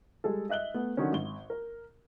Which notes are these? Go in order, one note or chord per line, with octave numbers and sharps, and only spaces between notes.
G3 G#3 G#4 A4
D#5 E5 F#6 F#7 G7
A3 B3
D3 D#3 F#3 C#4
G#1 G7
A#4